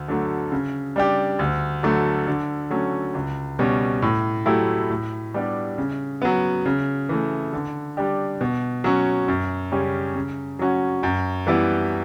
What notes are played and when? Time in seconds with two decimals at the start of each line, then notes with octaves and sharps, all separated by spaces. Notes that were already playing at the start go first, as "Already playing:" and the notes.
Already playing: D2
0.08 D3 F#3 A3
0.52 C#3
0.96 G3 D4 G4
1.39 D2
1.83 D3 F#3 A3
2.27 D3
2.71 F#3 A3 C#4
3.14 C#2
3.59 B2 G3 C#4
4.02 A2
4.46 F#3 A3 E4 G4
4.90 A2
5.34 G3 B3 D4 G4
5.78 C#3
6.22 F#3 B3
6.66 C#3
7.09 E3 A3
7.53 D3
7.97 G3 D4 G4
8.41 B2
8.84 F#3 C#4
9.28 F#2
9.72 C#3 G3 C#4 G4
10.15 C#3
10.59 F#3 C#4 F#4
11.03 F#2
11.47 E3 G3 B3 E4